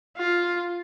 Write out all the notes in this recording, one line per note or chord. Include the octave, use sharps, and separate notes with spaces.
F4